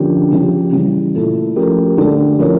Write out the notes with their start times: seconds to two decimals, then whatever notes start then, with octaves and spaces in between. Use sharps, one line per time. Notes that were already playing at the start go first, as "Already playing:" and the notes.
Already playing: D3 F3 A#3 C#4 G4
0.32 C#3 F3 C#4 G4
0.73 C#3 E3 G3
1.14 A#2 A3 E4 A4
1.56 F3 A3 C#4 G4 A#4
1.98 D3 A3 D4 G4
2.38 F3 C#4 E4 A#4 C#5